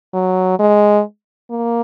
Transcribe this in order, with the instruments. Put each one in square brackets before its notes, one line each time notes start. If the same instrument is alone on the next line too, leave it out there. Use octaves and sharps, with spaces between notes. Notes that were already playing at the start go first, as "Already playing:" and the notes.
[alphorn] F#3
G#3
A#3